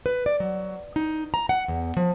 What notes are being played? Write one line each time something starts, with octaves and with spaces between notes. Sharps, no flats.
B4
D5
F#3
D#4
A#5
F#5
E2
F3